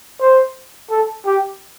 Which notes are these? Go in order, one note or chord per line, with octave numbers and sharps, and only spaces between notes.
C5
A4
G4